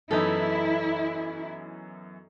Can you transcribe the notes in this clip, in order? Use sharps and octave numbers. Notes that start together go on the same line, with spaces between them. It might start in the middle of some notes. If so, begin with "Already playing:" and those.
F#2 E3 B3 D#4 E4 A4